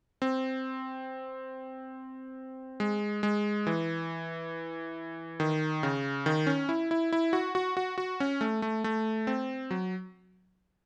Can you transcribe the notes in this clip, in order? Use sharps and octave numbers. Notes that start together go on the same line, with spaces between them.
C4
G#3
G#3
E3
D#3
C#3
D#3
C#4
E4
E4
E4
F#4
F#4
F#4
F#4
C#4
A3
A3
A3
C4
F#3